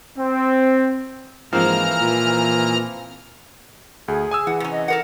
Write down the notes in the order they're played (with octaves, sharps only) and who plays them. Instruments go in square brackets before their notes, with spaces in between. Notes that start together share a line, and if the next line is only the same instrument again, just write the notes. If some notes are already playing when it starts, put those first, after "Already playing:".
[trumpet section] C4
[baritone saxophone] G#2 [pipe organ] E3 A#5 F6 [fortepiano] F3 A#3 C4
[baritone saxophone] A#2
[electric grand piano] D2 [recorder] G#4
[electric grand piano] G#5 D#6 E6
[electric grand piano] E3 [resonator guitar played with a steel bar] F#5
[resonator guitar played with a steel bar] C3 C#4
[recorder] D#5
[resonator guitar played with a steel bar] A4 A#4 F#5